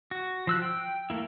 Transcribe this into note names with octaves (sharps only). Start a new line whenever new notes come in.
F#4
F3 E6 F#6
G5
A3 A#3 E4